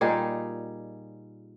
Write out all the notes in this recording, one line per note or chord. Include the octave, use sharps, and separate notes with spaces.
A#2 G3 D#4 G#4